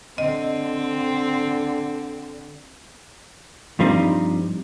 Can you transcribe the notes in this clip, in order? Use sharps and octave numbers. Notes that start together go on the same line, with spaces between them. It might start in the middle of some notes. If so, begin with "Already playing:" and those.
D3 C4 D#5
G2 F3 G3 C4 D#4